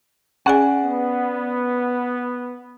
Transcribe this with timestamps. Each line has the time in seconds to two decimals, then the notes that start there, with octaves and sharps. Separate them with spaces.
0.46 C#4 G#4 D5 F#5 G#5
0.84 B3